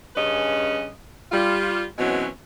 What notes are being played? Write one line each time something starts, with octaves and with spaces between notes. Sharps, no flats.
G2 C#3 C#4 B4 D#5
G3 F4
B2 E3 F#3 G#3 C4 C#4